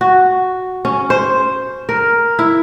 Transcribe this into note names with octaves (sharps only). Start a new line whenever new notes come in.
F#4
C#4
C5
A#4
E4